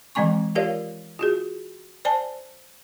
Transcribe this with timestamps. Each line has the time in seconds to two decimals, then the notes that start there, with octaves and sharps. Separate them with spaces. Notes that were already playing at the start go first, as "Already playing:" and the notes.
0.15 D#3 E3 G#3 C4 G#5 C#6
0.55 F4 G4 A#4 C#5 D5 F5
1.19 F4 F#4 G#4
2.05 C5 D5 G#5 A5